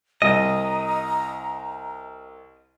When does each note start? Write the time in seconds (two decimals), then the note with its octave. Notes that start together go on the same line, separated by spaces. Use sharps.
0.22 C2 D#5 A#5